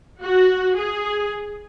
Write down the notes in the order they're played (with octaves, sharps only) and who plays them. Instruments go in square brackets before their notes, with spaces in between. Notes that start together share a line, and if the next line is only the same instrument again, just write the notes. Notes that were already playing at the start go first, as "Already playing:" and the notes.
[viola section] F#4
G#4